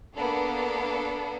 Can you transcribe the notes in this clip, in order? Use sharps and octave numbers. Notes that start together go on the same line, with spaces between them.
A#3 B3 D4 A4